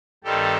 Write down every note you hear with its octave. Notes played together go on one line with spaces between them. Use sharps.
G2 D#3 G3 C4 D#4 G4 A4